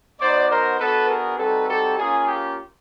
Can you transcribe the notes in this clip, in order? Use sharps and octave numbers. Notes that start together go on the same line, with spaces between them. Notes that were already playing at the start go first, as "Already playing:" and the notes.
B3 D#4 F#4 C5 D5
A#4 C5
B3 D4 F#4 A4 B4
G#4 A#4
G3 C4 D#4 F#4 A4 B4
G4 A4
A#3 C#4 F4 G#4
G4